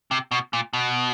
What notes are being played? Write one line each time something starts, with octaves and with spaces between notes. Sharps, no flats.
C3
B2
A#2
B2